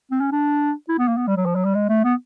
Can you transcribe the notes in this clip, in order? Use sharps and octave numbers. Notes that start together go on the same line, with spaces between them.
C4
C#4
D4
E4
B3
A#3
B3
G3
F#3
F3
F#3
G3
G#3
A3
B3